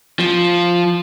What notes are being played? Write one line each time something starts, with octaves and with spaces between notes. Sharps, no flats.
F3